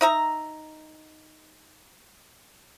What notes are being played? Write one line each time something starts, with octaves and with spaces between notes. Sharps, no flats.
D#4 E5 A#5